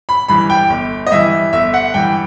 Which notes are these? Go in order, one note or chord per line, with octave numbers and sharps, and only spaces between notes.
B5
G2 E3 B5
G5
G1
D#5
G2 E3 E5
G1 E5
F#5
G2 E3 G5